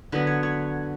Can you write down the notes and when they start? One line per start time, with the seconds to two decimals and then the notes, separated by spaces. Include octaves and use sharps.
0.12 D3 F#3 B3 B4
0.27 C#5
0.43 C#5